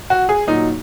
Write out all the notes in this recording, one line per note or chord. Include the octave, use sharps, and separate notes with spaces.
F#4
G#4
A#2 F#3 D#4